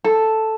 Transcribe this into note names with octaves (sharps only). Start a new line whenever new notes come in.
A4